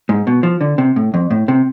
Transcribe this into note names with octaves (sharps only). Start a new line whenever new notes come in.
G#2
B2
F3
D3
C3
A2
F2
A2
C3